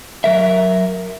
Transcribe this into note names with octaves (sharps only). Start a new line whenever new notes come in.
F#3 A#4 E5